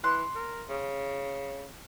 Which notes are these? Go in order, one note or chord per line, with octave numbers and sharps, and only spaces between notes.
E3 C6 F#6
A#4
C#3